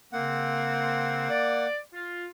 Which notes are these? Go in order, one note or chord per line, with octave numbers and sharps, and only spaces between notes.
C#3 A#3 C4 F#5
D5
F4